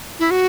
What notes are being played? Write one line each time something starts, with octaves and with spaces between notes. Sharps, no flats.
E4
F#4